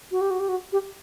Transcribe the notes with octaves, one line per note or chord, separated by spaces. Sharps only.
F#4
G4
F#4
G4
F#4
G4